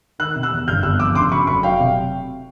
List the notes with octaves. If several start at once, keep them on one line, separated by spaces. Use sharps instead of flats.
D#3 E6 F#6
C3
E6 F#6
E2
G1 F6 G6
G1 E6 F#6
F2 D6 E6
C#3 C6 D6
F#3 B5 C#6
F1 B5 C#6
F#3 F5 G5
C3